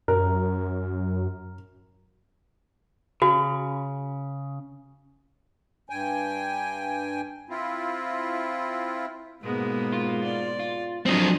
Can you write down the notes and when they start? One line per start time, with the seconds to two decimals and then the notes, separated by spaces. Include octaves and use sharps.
0.08 F#2 A#4
3.22 C#3 F#4
5.90 G2 G5 G#5
7.50 C4 E4 F4
9.43 G#2 B2 G#3 A#3 B3
9.93 F4
10.23 D5
10.59 F4
11.06 F3 F#3 C4 D4 D#5